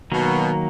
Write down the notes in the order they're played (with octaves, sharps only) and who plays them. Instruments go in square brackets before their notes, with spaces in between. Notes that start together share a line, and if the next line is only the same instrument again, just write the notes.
[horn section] B2 [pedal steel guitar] D#3 F#3 A#3